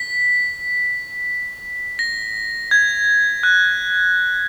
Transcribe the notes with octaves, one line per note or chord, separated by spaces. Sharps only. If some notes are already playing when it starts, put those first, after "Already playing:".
Already playing: B6
A#6
G#6
F#6